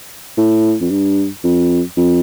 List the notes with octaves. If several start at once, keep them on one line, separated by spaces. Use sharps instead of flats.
A2
F2
G2
F2
F2